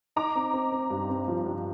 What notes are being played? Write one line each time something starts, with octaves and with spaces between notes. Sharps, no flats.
D#4 A#5 D6
C4
C4
C4
G2
C4
F3
G2